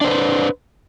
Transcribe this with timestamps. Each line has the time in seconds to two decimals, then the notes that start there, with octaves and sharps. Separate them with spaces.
0.01 D4
0.04 C5
0.08 B4